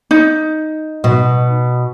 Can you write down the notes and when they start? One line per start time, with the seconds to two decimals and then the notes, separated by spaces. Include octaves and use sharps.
0.11 D#4
1.04 B2